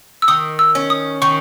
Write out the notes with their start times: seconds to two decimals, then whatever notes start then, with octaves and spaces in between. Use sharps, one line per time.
0.22 E6
0.28 D#3 D#6
0.59 E6
0.75 C#4
0.90 D#6
1.22 D#3 C#6